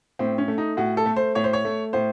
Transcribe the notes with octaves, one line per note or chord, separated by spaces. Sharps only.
A2 C4
C#4
A3
D#4
A2 F#4
A4
A3
C5
A2 C#5
C5
C#5
A3
A2 C5